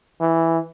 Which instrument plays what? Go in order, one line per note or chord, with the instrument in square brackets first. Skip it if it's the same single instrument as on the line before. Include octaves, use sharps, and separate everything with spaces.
[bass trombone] E3